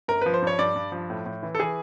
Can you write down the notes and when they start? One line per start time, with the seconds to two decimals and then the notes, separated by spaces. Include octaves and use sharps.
0.08 G1 A#4
0.21 F3 B4
0.34 C5
0.42 G2 C#5
0.59 G2 D5
0.76 G2
0.92 F3
1.10 A2
1.26 A2
1.43 E3
1.55 A4
1.59 E3 G#4